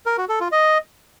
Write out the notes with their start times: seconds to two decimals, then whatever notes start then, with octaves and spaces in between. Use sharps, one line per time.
0.06 A#4
0.18 F#4
0.29 A4
0.41 F4
0.52 D#5